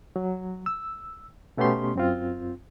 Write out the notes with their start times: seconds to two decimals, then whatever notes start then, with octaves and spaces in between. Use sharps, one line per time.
0.16 F#3
0.66 E6
1.57 B2 A3 B3 C#4 G4 C6
1.96 F#2 C4 F4